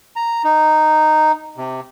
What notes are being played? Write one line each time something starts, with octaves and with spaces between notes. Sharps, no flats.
A#5
D#4
C3